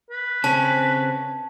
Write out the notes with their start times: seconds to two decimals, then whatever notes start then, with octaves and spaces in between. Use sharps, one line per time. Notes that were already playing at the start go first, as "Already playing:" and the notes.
0.11 B4
0.44 C#3 C4 C#4 A5